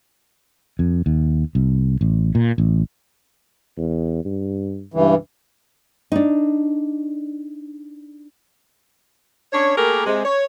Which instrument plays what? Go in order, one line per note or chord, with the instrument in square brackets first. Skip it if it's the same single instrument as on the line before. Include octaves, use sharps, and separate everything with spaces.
[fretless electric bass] F2
D#2
C2
A1
A#2
A1
[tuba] E2
G2
[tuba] C#2 [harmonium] G2 E3
[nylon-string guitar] D4 D#4
[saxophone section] C#4 D4 C#5
A3 A#3 G4 G#4 A#4
C3 G#3
C#5